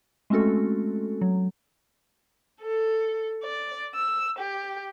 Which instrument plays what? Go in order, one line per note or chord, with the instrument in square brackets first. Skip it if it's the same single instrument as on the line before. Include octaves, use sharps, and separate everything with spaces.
[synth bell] G#3 A3 C4 C#4 F#4 A4
F#3
[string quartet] A4
D5
E6
G4